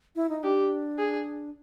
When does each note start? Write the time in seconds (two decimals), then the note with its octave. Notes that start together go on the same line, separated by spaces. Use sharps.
0.16 E4
0.29 D#4
0.43 D4 G4
0.98 G#4